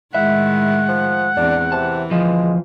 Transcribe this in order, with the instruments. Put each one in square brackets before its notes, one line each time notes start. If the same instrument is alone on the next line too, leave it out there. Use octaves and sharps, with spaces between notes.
[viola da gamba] A2 D#3 G#3 [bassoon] E4 [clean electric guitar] E5 [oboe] F#5
[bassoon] F3
[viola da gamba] E2 C4 [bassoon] D4
[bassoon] C3 [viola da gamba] E3 [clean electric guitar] A5
[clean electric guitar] D2 F3 [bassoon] G#3